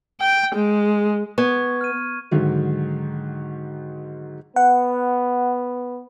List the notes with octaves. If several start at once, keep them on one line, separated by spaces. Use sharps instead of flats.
G5
G#3
B3 C#6 G#6
F6 D#7
G#2 D3 D#3 F#3
B3 F#5